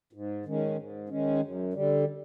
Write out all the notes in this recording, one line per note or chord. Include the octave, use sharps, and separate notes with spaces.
G#2
D#3 G#3 C#4
G#2
D#3 G#3 C#4
F#2
D3 G3